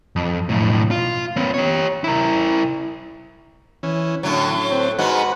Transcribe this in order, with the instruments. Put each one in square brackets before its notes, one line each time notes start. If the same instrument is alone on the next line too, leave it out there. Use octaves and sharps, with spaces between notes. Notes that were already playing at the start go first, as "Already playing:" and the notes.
[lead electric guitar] F2
B1 A2
F4
B3 C#4
G4 C#5
E4 A#4
[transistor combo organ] E3 C#4
[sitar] A2 F#3 [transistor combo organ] D3 C#4
[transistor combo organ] C4
[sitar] G#2 G#3 [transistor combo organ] F#4 B4 F#5